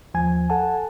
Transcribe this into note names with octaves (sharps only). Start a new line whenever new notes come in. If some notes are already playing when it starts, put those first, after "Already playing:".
D#2 F3 G#5 G#6
A4 F#5 G#5 A5